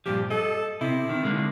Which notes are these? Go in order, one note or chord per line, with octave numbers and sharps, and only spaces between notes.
G2 A#2 F3 G4
A4 D#5
C3 E4
C3 D#3
D3 G#3 A#3